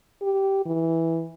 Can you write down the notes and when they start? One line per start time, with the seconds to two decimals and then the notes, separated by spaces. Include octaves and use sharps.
0.22 G4
0.66 E3